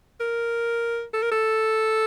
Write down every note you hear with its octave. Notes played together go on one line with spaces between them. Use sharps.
A#4
A4
A#4
A4